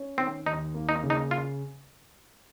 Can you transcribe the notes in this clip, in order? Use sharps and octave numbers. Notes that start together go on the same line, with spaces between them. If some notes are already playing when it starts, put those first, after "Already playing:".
Already playing: C#4
D#3 C4
D#2 D#4
A#3
D#4
C#3
D#4
F4